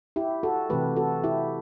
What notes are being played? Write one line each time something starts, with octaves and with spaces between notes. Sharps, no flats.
E4 G4
F#4 A4
C3 E3 A3 G4 B4
F#4 A4
E4 G4